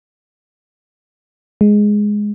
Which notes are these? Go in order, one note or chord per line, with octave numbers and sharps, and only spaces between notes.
G#3